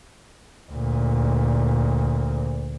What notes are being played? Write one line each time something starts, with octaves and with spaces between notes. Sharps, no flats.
D2 A#2